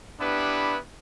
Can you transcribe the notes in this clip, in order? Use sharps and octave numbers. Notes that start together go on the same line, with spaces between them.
B3 D4 E4 G4 B4